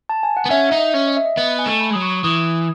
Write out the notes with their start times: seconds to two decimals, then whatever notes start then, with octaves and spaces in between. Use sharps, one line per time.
0.09 A5
0.23 G#5
0.37 F#5
0.46 B3
0.50 C#4 E5
0.69 D#4 E5
0.79 D#5
0.94 C#4
1.07 D#5
1.17 E5
1.25 D#5
1.37 B3 D#5
1.59 G#5
1.66 A3
1.81 B5
1.90 G#3
1.93 F#3 D#6
2.02 C#6
2.24 E3 D#6